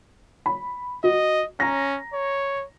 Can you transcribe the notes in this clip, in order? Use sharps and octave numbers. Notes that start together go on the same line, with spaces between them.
B5
F#4 D#5
C#4 A#5 A#6
C#5